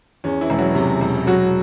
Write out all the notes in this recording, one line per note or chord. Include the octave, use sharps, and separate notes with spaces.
E2 C#4
E3 E4
E1
F#3 F#4
C3
E1
F#3 F#4